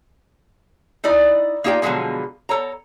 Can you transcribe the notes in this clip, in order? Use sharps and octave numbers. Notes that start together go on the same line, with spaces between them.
D#4 E4 D5 D#5
A#3 D#4 F4 G4 D5 G5
B2 D3 F3 F#3 G#3 C#4
A4 C#5 A#5